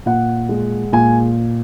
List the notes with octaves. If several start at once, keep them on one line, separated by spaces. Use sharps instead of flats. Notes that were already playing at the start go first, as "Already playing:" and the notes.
A#2 F#5
G#3
A#2 G#5